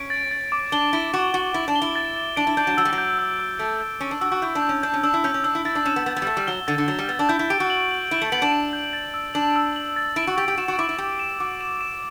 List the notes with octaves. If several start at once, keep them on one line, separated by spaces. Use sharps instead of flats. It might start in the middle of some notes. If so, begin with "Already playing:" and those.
Already playing: C#4 D7
A6
A6
D6
D4 G7
E4 G7
F#4 E7
F#4 A6
E4 A6
D4
G7
E4
A6
A6
D4 D7
E4
D4 G6
F#3
F#3 E6
G3
F#3
G6
E6
E6
A3 D7
G6
C#4 D7
D4
F#4 E6
F#4
E4 G6
D4
G6
C#4
D4 G6
C#4
D4 E6
E4
C#4 G6
C#4
D4 E6
E4
E4 A6
D4
C#4 E7
B3
B3 A6
B3
G3
A3 A6
G3
F#3 G7
D3 A6
D3
F#3 A6
G3
B3 A6
D4
E4 G6
E4
G4 D7
F#4
F#7
F#7
E4 D7
A3
B3 F#7
D4
D7
G6
A6
E6
D4 F#7
E6
F#7
A6
E4 D7
F#4
G4 A6
G4
F#4 E7
F#4
E4 D6
E4
G4 E7
E7
F#4 D6
E7
E7